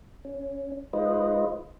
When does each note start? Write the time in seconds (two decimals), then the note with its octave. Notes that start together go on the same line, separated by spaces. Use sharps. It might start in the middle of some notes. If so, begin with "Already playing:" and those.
0.25 C#4
0.93 G#3 D#4 F4 B4 C5 D#5